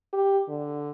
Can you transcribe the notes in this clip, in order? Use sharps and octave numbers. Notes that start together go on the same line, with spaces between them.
G4
D3